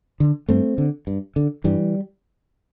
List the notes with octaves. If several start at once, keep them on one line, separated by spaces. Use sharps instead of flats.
D3
G2 A3 C4
D3
G2
D3
G2 E3 G3